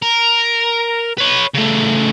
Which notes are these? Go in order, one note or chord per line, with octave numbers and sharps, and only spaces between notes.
A#4
B4 C#5
C#3 A3